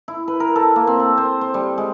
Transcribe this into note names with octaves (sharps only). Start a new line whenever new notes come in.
E4
B4
A#4
A4
A#3
C4
A5
C5
C5
G3
G#3